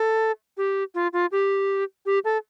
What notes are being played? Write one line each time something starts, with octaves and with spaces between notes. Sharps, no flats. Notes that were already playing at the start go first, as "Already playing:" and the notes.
Already playing: A4
G4
F4
F4
G4
G4
A4